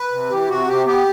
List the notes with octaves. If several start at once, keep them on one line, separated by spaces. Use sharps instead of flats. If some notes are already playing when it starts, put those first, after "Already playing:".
Already playing: B4
C3
E3 G4
C3 F#4
C3 G4
B3 G4